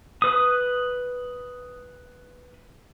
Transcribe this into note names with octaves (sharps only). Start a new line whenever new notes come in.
B4 D#6